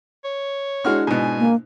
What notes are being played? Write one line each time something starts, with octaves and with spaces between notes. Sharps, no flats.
C#5
G#3 D4 E4 F#4 F6
G#2 B2 G#5
A#3